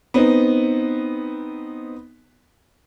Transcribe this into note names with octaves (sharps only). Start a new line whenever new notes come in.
B3 C4 D#4